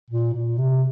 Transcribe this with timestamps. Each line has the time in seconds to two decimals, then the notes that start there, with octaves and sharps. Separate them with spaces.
0.10 A#2
0.34 A#2
0.58 C3